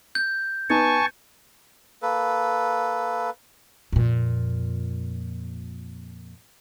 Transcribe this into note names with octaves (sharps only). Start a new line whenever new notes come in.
G6
B3 D#4 G#5 A5 C#6
A#3 A4 B4
F2 A#2